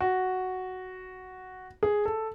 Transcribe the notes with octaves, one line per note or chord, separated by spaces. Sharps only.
F#4
G#4
A4